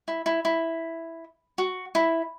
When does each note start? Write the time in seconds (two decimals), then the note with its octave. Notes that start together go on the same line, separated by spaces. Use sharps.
0.08 E4
0.26 E4
0.45 E4
1.58 F#4
1.95 E4